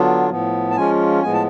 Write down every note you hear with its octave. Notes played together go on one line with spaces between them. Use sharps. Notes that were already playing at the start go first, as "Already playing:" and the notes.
Already playing: D3 F#3 B3 D4 F4
A2 F3 B3
A5
F3 G#3 C#4 F4 G#5
A2 F3 G#3 B3 G#5
A5